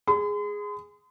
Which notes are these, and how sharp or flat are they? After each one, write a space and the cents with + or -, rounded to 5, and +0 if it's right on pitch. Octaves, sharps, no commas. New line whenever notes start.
G#4 -5 C6 -45